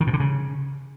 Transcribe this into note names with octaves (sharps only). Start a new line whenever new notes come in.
D#3
B2
D3
C#3